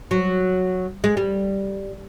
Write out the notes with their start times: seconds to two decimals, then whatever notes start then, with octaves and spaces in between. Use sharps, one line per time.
0.11 F#3
1.04 G#3
1.17 G3